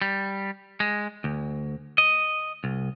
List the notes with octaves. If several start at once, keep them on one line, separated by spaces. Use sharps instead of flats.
G3
G#3
D2
D#5
C2